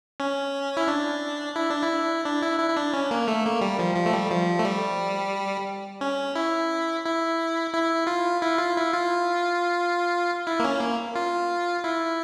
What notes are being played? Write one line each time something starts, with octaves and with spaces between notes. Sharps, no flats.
C#4
E4
D4
E4
D4
E4
D4
E4
E4
E4
D4
C#4
A#3
A3
A#3
G3
F3
F3
A3
G3
F3
A3
G3
C#4
E4
E4
E4
F4
E4
F4
E4
F4
E4
A#3
C#4
A#3
F4
E4